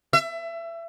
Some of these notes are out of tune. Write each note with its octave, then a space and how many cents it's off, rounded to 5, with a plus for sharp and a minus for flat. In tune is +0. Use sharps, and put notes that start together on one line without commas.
E5 +25